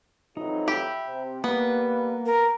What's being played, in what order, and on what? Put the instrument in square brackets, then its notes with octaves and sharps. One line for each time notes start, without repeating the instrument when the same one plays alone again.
[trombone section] F2 E3 F#3 [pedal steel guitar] D#4
[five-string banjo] G4 [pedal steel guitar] E5 B5
[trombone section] C3
[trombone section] G3 B4 [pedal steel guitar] A#3 [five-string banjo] B3
[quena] A#4